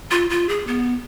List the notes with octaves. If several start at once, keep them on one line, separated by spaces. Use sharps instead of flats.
F4
F4
G#4
B3